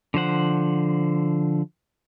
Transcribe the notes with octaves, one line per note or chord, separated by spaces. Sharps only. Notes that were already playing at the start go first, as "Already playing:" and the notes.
D3 F3 C5 F#5